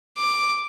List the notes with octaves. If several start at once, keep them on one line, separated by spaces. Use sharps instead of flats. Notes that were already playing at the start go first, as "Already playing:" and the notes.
D6